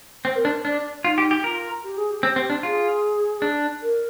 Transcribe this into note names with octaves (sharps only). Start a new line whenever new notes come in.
C4 C5
A#4
D4 C5
D4 D5
D#4 F4
G4
G4
F4 A#4
G4
G#4
G4
C4
C4
D4
F4 G#4
D4
A#4